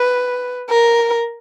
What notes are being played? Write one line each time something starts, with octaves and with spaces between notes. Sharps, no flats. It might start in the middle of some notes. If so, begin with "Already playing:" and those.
Already playing: B4
A#4